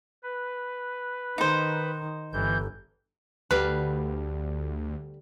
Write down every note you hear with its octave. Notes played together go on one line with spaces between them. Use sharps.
B4
D#3 D#4 C5
G1 E3 G6
D2 D3 G3 B4 F5